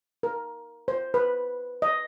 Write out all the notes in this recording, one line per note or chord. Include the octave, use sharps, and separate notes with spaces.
A#4
C5
B4
D#5